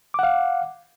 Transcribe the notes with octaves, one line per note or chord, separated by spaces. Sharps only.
F5 F#5 D6